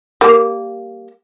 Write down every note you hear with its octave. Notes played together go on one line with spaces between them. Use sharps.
G3 A#3